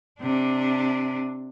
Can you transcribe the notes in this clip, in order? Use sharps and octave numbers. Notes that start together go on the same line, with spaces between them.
C3 D4